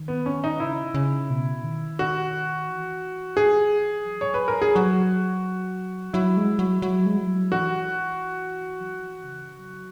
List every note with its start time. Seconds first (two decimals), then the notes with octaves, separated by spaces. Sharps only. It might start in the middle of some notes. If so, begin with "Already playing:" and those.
Already playing: D#3
0.08 B3
0.26 C#4
0.44 D#4
0.60 C#3 E4
0.94 C#3
1.30 B2
1.64 D#3
1.99 F#4
2.68 E3
3.37 G#4
4.05 F#3
4.21 C#5
4.34 B4
4.48 A#4
4.62 G#4
4.75 F#3 F#4
6.13 F#3 E4
6.37 G#3
6.59 F#3
6.82 F#3
7.06 G#3
7.17 F#3
7.52 E3 F#4
8.80 F#3
8.90 E3
9.24 C#3
9.59 F#3